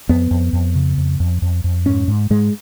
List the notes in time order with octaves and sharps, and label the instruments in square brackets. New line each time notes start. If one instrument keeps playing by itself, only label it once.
[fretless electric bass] F2 B3
F2
F2
C#3
F2
F2
F2
F2
G#2 C#4
G#2
G#2 G#3